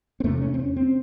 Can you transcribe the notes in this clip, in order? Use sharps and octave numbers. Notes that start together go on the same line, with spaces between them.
C4
E2 C3 A3
C#4
C4
C#4
C4